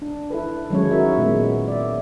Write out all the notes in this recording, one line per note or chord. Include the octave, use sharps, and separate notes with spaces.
D4
E4 A4 B4
D#3 F#3 G#3 C#4 C#5
E4 F#4 A#4 E5
A#2 G#3 B3
D5 E5